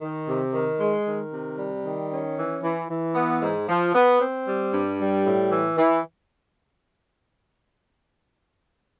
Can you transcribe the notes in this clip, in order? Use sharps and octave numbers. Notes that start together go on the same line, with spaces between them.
D#3
C3
D#3
G#3
D#3
C3
G3
D#3
C#4
E3
E3
E3
B3
G#2
F3
B3
C4
G3
G2
G3
A2
E3
E3